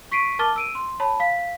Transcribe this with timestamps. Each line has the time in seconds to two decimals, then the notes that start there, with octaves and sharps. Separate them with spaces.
0.11 C#6 B6 C7 D7 D#7
0.39 A#4 A5 D6 F6 A6 G7
0.56 E6 D7 D#7
0.75 C6
1.00 C#5 A5 B5
1.20 F5 B6